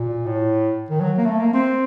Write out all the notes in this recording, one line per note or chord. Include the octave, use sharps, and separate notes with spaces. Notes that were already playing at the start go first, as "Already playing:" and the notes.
Already playing: A#2
A2
D#3
F#3
A#3
A3
A#3
C4